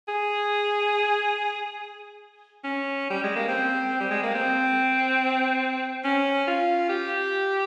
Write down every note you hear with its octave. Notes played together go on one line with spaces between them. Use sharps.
G#4
C#4
G3
G#3
A#3
C4
G3
G#3
A#3
C4
C#4
F4
G4